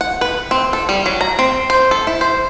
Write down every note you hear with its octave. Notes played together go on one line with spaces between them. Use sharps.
F#5
B4
C4
A4
G3
F#3
A#5
C4
C5
A4
E4
C5